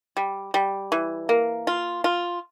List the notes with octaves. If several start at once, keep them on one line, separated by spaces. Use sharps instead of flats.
G3
G3
E3
A#3
F4
F4